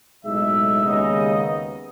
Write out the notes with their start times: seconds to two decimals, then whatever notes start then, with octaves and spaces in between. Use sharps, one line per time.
0.25 B1 A2 G#3 D#4 E5
0.84 D#2 C#3 G#3 B3 D#4 D#5